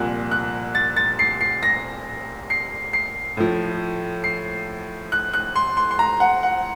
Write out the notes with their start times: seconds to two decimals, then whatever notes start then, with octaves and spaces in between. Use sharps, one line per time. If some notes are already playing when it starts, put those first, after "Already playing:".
Already playing: C2 A#2 F3 F#6
0.31 F#6
0.75 A6
0.96 A6
1.19 C7
1.41 C7
1.63 A#6
2.50 C7
2.93 C7
3.37 A2 F3
4.24 C7
5.12 F#6
5.34 F#6
5.55 C6
5.77 C6
5.91 C6
5.99 A#5
6.20 F#5
6.43 F#5